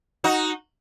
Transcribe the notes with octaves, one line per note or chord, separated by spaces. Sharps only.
D#4 F#4